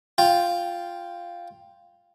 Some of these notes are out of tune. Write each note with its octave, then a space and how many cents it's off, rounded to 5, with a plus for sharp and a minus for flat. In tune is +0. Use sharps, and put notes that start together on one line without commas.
F4 +0 G5 +0